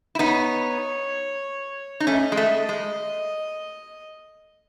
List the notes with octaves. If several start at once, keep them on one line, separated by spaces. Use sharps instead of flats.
E4
B3 D#4 C#5
D#4
A3 C#4 D#5
G#3
A3
G#3